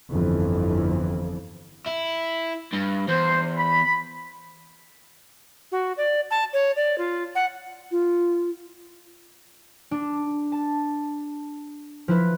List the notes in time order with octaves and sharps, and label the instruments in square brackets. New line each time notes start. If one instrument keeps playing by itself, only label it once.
[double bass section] G1 F2 E3 F3
[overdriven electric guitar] E4
G2
[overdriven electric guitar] E2 [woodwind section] C5
[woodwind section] B5
[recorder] F#4
D5
A5
C#5
D5
F4
F#5
[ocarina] F4
[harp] D4
A5
F3 E4 B4